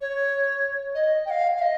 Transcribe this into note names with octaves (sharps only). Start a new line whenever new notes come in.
C#5
D#5
G5
F5
F5
D#5